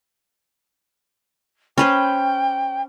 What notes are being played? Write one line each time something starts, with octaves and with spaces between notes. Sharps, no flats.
C#4 B4 C5 G5